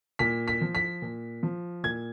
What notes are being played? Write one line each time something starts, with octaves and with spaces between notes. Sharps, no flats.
A#2 B6
B6
F3
B6
A#2
F3
A#2 G#6